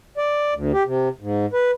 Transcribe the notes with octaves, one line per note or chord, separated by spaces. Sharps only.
D5
D2
G4
C3
G#2
B4